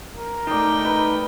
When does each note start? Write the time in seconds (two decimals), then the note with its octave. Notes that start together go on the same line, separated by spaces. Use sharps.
0.16 A#4
0.47 A3 D#4 D5 D#5 G5
0.85 D#4 B4